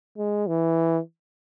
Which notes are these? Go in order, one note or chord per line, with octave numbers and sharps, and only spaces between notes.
G#3
E3